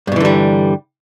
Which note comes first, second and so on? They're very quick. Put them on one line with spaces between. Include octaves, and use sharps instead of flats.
G2 B2 E3 D3 G3